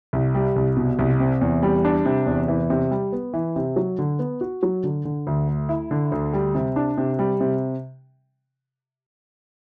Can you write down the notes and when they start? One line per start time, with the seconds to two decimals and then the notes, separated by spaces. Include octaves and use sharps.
0.13 C2
0.35 G3
0.56 C2
0.77 B2
0.99 C2
1.20 C3
1.41 E2
1.63 G3
1.85 D4
2.05 C3
2.26 E2
2.48 E3
2.70 C3
2.91 G3
3.12 B3
3.34 E3
3.56 C3
3.76 F#3
3.99 D3
4.19 B3
4.41 F#4
4.63 F#3
4.84 D3
5.05 D3
5.27 D2
5.48 A3
5.69 E4
5.91 D3
6.12 D2
6.33 G3
6.55 C3
6.76 D4
6.97 C3
7.19 G3
7.41 C3